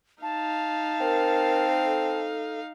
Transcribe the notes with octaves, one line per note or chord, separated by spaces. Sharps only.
D#4 F5 A5
C4 A#4
A4